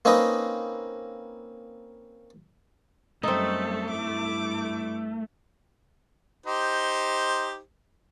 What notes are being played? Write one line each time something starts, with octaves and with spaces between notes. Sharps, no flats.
A#3 C4 C#4 D#4 B4 D#5
F#2 G3 A3 C4 D#4 A4
G2 E4 D6
D#4 G4 C5